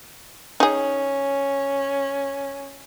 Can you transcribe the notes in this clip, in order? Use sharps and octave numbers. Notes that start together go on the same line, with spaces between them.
C#4 D#4 G#4